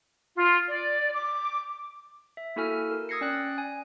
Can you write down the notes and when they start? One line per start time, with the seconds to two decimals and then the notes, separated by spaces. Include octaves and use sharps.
0.36 F4
0.68 D5
1.14 D6
2.37 E5
2.56 A#3 E4 F#4 A4 G#5 F6
2.91 A#4
3.09 D#6 E6 G#6 A#6 C7 C#7
3.21 C#4 D5 G5 D#6 F#6
3.58 G#5